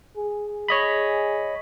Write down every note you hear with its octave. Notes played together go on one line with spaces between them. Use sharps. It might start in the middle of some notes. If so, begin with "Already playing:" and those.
G#4
C#5 D#5 B5